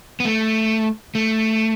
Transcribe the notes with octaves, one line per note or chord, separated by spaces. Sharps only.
B3
A3
A3